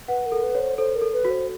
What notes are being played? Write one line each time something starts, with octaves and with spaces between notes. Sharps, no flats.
B4 F#5
A#4
A4
B4
C#5
C5
A4 C5
A#4
A4
B4
F#4
C5